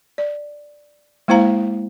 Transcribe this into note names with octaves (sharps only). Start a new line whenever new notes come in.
D5
G#3 A#3 E4 C5 F5 A#5